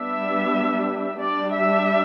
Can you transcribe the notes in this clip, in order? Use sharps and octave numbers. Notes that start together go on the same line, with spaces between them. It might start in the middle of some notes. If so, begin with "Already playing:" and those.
Already playing: G3 B3 D4 E5
G3 D4 D5
E5